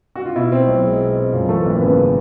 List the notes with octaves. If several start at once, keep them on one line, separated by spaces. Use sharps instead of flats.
F#4
F4
B2 E4
C4
B1
G#3
B2
C4
F#2 F4
E3 A3 A4
G#1 A#3 A#4
C#3 B3 B4